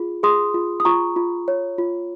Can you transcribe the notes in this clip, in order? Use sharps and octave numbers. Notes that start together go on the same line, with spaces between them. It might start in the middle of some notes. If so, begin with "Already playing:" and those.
Already playing: F4 G#4
G#4 C6 D#6
F4
D#6
F4 A#5 C#6
F4
C#5
F4